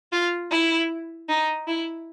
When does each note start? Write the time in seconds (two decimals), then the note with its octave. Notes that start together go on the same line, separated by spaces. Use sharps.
0.12 F4
0.51 E4
1.29 D#4
1.68 E4